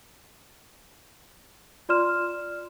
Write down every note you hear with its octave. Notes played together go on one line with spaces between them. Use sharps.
F4 D5 C6 F6 E7